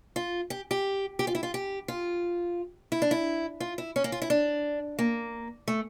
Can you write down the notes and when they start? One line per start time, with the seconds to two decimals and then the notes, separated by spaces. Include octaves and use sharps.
0.16 F4
0.50 G4
0.71 G4
1.19 G4
1.27 F4
1.35 E4
1.43 F4
1.54 G4
1.88 F4
2.92 E4
3.02 D4
3.11 E4
3.60 F4
3.78 E4
3.96 C#4
4.04 A#3
4.12 F4
4.22 E4
4.30 D4
4.99 A#3
5.68 A3